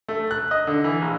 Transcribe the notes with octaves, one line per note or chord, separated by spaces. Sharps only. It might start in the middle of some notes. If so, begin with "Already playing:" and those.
A3
F#6
D#5
D3
E3
A#1